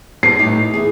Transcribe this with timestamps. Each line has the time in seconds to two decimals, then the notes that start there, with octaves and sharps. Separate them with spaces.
0.23 G3 B3 C4 C7
0.39 A2 D#4 G4
0.74 E2 G#4